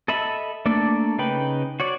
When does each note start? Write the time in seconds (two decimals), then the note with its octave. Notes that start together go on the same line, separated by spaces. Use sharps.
0.08 A4 D#5 E5 B5
0.66 A3 A#3 D4 A4 D5
1.18 C#3 D#4 B4 G5 B5
1.80 F#4 C#5 D5